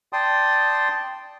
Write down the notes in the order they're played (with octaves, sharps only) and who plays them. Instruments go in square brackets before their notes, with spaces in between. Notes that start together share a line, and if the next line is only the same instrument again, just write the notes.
[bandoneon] D5 G5 A5 C6 D#6